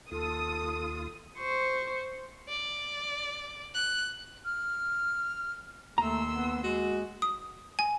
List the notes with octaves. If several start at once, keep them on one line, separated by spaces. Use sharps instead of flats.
D#2 F4 A4 D#6
C5 C#6
D5
F#6
F6
D#2 A3 A#5 C6 E6
B3
G#3 F#4
D#6
G#5